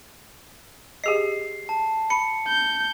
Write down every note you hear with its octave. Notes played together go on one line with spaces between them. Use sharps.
G4 G#4 D#5 C7
A5
B5 C#7
G6